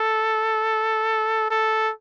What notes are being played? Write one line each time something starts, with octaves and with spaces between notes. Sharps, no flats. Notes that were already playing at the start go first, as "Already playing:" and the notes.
Already playing: A4
A4